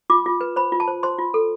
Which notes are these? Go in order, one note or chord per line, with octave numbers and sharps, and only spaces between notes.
F4 D6
F4
B4
C5 B5
F4
A5
C5
C5 C6
F4
A4